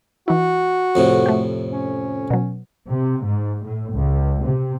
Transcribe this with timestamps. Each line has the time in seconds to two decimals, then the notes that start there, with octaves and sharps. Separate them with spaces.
0.28 E3 E4 F#4
0.95 F2 A2 C3
1.26 A3 G4
1.72 C#4
2.30 B2 F#3
2.89 C3
3.23 G#2
3.62 A2
3.93 C#2
4.45 C3